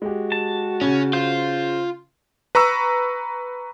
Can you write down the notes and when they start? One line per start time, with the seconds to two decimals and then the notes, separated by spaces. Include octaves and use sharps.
0.02 G#3 F#4 G4
0.32 A5
0.81 C#3 C#4
1.13 F4 C5
2.55 B4 A#5 C#6 E6